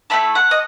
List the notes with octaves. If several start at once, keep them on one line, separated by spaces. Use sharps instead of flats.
A3 E4 A4 B5
F#5
D#5